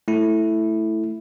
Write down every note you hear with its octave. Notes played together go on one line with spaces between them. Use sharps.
A3 E4